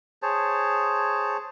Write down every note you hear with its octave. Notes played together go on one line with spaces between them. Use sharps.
G#4 C5 C#5 A5